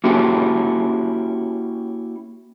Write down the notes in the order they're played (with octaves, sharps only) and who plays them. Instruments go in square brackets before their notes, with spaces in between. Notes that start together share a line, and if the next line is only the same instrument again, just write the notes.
[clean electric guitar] A#3 C#4 E4 F#4 G4